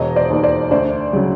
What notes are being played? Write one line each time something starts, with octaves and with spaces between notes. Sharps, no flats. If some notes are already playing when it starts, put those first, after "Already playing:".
Already playing: E1 C#5 D#5
C5 D5
D#2 D#3
C5 D5
D2 C5 D5
C#3 F#3